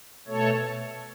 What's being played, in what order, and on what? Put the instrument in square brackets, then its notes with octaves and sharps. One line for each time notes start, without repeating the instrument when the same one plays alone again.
[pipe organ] B2 A3 A4 C#5